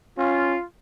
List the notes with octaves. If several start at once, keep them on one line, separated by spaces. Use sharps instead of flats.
C#4 F4